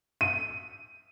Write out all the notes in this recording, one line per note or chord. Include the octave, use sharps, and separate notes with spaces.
D#7